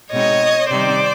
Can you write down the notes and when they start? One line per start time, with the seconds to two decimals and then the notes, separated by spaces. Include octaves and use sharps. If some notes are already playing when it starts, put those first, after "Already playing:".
0.12 B2 G#3 C4 D#4 C#5 D#5
0.70 C3 D#3 G3 C4 D#4 C5 D5